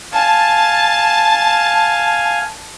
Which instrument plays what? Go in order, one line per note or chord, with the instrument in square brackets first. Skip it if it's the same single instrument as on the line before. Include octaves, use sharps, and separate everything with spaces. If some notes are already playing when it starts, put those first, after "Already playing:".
[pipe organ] F5 G#5 [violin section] A5